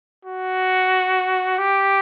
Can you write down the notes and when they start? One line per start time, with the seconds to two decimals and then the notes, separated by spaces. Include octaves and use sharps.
0.25 F#4
1.58 G4